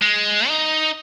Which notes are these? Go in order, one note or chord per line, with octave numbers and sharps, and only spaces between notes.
G#3
D#4